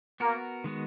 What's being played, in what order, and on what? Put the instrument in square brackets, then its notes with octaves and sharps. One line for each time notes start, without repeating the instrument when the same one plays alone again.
[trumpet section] A#3 [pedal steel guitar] B3 F#4 A#4
[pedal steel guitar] D#3 G#3 B3 F#4